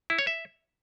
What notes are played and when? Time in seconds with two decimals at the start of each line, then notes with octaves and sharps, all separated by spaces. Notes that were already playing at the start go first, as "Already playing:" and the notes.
0.10 E4
0.19 C#5
0.27 E5